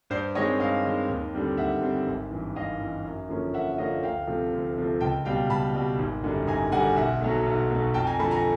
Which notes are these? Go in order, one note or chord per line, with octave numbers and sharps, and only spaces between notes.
G2 C5 D5
D#3 G#3 C4 C#5 D#5
G2 D#5 F5
D#3 G#3 C4
D#2
D3 G3 C4
D#2 E5 F#5
D3 G3 C4
G#1
G2 E3
G#1 D#5 F5
G2 E3
F#2
D3 F3 A#3 C#4
F#2 E5 F#5
D3 F3 A#3 C#4 D#5 F5
D2 F5 G5
C3 F3 A3
D2
C3 F3 A3
C#2 G5 A5
B2 G3 B3 F5 G5
C#2 A5 B5
B2 G3 B3
G#1
F#2 D3 G3
G#1 G#5 A#5
F#2 D3 G3 F#5 G#5
B1 E5 F#5
B2 F#3 A3
B1
B2 F#3 A3
F2 G5 A5
G#5 A#5
D3 F3 A3 A5 B5
G#5 A#5